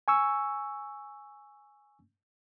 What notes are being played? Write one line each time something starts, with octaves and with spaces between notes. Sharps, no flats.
G#5 C#6 E6